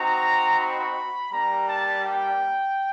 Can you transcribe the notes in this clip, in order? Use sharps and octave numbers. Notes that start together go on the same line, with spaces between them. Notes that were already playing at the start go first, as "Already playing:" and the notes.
Already playing: C4 D#4 F#4 A#5
B5
G3 A#3 D4 A#5
A5
G5